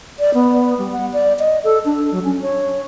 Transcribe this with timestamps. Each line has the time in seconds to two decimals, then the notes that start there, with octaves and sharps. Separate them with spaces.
0.19 D5
0.34 B3
0.78 G3
0.92 F#5
1.13 D5
1.39 D#5
1.64 A4
1.85 D4
2.12 F#3
2.24 C#4
2.42 C#5